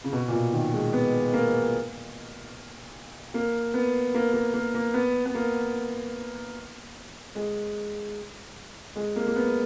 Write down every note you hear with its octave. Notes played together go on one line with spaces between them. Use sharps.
C#3
B2
A#2
B2
D#3
G#3
B3
A#3
A#3
B3
A#3
A#3
A#3
A#3
B3
B3
A#3
G#3
G#3
A#3
A#3
B3